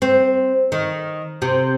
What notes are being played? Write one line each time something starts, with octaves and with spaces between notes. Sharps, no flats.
C4
D#3
C3